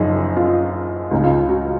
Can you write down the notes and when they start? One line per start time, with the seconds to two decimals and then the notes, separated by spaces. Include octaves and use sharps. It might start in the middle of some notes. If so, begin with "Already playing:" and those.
Already playing: F#1 F#2 F3 D#4 G#4
0.36 F4
1.11 C#2 C#3 G#3 D#4
1.24 F4
1.49 F#4